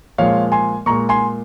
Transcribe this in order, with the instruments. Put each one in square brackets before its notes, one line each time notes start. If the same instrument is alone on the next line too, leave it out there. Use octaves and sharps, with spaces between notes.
[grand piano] A#2 F3 G#3 C#5 F5
G#5 C6
A#2 G#3 A#5 C#6
G#5 C6